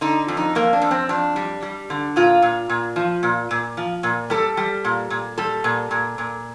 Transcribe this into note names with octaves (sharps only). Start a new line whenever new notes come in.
D3 D#4
F2
D#4
F2 A#3
D4
F2
C4
F2 D4
G3
G3
D3
A#2 F4
A#2
A#2
F3
A#2
A#2
F3
A#2
G3 A4
G3
A#2
A#2
G3 A4
A#2
A#2
A#2